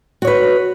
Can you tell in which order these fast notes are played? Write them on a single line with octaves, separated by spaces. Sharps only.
F#4 C#5 B4